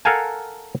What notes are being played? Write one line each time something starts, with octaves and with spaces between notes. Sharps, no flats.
A4 A#4 F5 F#5 G#5 A5